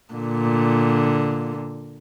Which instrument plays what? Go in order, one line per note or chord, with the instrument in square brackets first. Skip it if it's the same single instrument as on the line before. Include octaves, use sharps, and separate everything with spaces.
[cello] A#2 D3